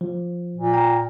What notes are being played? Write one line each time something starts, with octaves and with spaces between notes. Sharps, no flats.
F3
A#2
G5 A#5